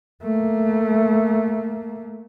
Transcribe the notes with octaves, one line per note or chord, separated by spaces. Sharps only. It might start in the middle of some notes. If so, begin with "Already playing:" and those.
A3 A#3